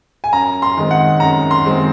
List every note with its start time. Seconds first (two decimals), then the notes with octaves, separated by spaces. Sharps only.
0.24 G#5
0.32 F#2 A#5
0.62 C6
0.77 D#3 G#3 C4
0.91 F#5
1.20 F#2 A#5
1.51 C6
1.65 D#3 G#3 C4